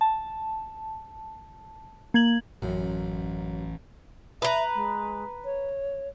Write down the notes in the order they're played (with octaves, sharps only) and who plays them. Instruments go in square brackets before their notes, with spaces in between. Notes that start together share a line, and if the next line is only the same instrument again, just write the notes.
[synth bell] A5
A#3 G#6 F#7
[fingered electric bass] A1 [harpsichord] F#2
[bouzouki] B4 A#5 [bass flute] E5
[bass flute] G#3
C#5